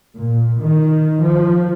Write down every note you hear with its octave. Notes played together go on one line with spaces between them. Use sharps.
A#2
D#3
F3